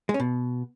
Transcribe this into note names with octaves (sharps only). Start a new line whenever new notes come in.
G#3
C#4
B2